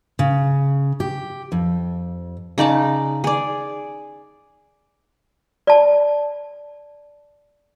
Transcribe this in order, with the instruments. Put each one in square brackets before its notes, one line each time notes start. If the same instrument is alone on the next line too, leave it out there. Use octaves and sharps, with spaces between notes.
[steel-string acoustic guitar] C#3
G4
F2
[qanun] C#3 D#4 D5 A5
G#4 D5
[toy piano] D5 A5